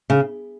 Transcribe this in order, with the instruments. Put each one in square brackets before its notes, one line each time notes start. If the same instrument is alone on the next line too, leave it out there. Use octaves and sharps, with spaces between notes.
[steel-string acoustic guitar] C#3